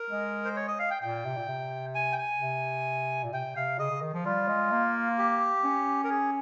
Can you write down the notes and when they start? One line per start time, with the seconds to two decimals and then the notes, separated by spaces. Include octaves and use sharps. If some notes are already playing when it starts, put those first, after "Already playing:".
Already playing: A#4
0.10 G#3
0.45 C5
0.56 C#5
0.68 D#5
0.79 F5
0.91 G5
1.03 A#2 G5
1.25 C3
1.37 A#2
1.49 C3
1.95 G#5
2.13 G5
2.18 G#5
2.41 C3
3.24 A#2
3.33 C3 G5
3.56 C3 F5
3.79 C#3 D#5
3.91 C#3
4.02 D#3
4.14 F3
4.25 G3 F4
4.48 G#3
4.72 A#3
5.18 G4
5.64 C#4
6.04 A#4
6.10 G#4